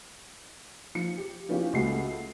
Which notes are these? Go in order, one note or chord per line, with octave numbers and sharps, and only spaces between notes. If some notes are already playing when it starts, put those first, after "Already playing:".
F3 C#7
G4
F3 B3 C#4 E4 F4 G4
C#2 A3 F#4 A4 C7